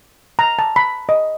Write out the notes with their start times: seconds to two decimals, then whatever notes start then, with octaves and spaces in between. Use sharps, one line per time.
0.39 A#5
0.59 A5
0.76 B5
1.09 D#5